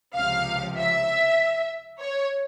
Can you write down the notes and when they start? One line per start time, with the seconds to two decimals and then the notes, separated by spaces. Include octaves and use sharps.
0.14 C#2 C3 F3 F5
0.76 E5
2.00 C#5